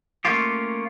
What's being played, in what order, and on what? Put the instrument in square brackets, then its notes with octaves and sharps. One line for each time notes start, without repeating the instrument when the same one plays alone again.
[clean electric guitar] A3 A#3 C#4 F4 G4